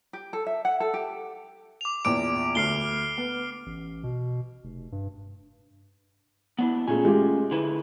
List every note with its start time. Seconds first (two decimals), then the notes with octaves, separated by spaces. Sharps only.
0.13 G4
0.33 A4
0.46 E5
0.65 F#5
0.80 A4
0.94 G4
1.81 D6 F7
2.05 A#1 E2 D6 D7
2.55 D2 F6 C7 G7
3.18 B3
3.66 A1
4.03 B2
4.64 F1
4.92 G2
6.59 B3 D4 E4
6.88 A#2 A3 C#4 G#4 G#5
7.05 G#3 F4 G4
7.51 D3 E4 B4